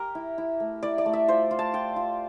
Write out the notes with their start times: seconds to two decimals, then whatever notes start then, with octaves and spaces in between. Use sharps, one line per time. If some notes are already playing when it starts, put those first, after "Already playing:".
Already playing: G4 A#4
0.15 E4
0.38 E4
0.60 A3
0.83 E4 D5
0.98 D5
1.06 A3
1.13 E5
1.28 F4 C5
1.51 F4
1.59 A5
1.74 F4 G5
1.96 F4